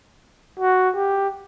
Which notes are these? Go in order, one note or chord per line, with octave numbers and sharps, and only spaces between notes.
F#4
G4